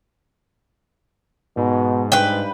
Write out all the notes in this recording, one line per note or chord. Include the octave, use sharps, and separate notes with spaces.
G#2 B2
G2 B4 G5